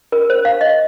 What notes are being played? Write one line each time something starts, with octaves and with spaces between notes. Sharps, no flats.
A#4
C5
F5
D#5